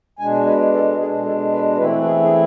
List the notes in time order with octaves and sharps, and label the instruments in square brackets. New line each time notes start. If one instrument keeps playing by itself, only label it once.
[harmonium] B2 G#3 D4 G#5
B4
A4
B2 G#3 D4 G#4
A4
B4
E3 A3 C4 E4 B4
G#4
G#4